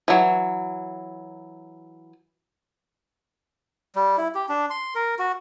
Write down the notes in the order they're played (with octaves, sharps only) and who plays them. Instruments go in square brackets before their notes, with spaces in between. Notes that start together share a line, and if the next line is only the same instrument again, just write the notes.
[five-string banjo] E3 F#3
[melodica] G3
E4
G4
D4
C6
A#4
F#4